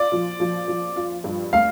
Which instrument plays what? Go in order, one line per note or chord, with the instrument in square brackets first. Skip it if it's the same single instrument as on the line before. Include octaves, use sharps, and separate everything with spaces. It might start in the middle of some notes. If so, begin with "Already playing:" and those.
Already playing: [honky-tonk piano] F4 [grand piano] D5
[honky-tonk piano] F3
F3
F3
F4
G2
[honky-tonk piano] A3 [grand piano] F5